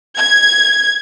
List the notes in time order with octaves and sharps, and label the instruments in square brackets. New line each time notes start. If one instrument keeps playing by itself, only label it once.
[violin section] G#6